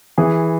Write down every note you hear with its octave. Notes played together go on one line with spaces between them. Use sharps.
E3 G#4